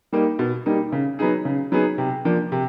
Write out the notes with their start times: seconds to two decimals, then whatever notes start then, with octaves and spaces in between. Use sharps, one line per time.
0.13 G3 A#3 D#4
0.39 B2
0.66 G3 A#3 D#4
0.92 C#3
1.19 F#3 B3 D#4 G#4
1.45 C#3
1.72 F#3 B3 D#4 G#4
1.98 C3
2.25 F3 A#3 D4
2.52 C3